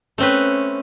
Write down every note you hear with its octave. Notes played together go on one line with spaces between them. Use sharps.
A3 C4 C#4 B4